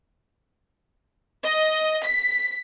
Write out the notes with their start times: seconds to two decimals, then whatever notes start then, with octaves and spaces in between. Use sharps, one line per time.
1.45 D#5
2.04 B6